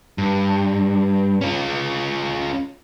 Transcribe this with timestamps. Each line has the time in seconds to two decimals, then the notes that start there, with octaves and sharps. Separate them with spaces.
0.18 G2
1.41 C#4 F4